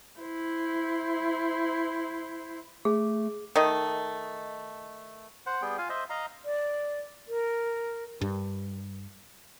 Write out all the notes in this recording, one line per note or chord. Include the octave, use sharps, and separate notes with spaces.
E4 C5
A3 G#4
D#3 A3 D#5
C5 F#5
G3 B3 G#4 G5
F4 F5 G#5
C5 D#5 E5
D#5 F5 A#5
D5
A#4
G2